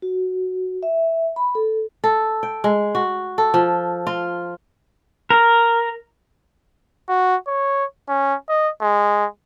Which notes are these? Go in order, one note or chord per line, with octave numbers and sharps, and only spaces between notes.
F#4
E5
B5
A4
A4
G5
G#3
F#4
A4
F3
F4
A#4
F#4
C#5
C#4
D#5
G#3